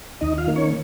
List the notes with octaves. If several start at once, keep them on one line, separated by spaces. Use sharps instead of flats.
D#2 D#4 D#5
F4 F5
D#3 A#3
C#4 C#5